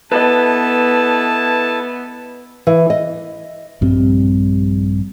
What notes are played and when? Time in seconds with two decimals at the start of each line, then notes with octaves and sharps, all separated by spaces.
0.12 B3 E4 A4 B4 D#5 A5
2.67 E3
2.90 D#5
3.81 A#1 G2 G3 C4